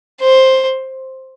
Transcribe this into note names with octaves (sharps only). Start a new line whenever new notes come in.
C5